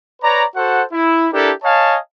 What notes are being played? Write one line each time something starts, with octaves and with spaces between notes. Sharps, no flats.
B4 C#5 D5 A#5
F#4 A4 C5 F#5
E4
D4 E4 G4 A4 A#4
C#5 D#5 F5 G#5 A5